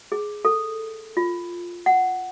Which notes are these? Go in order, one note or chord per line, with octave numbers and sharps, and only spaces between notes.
G#4
A4
F4
F#5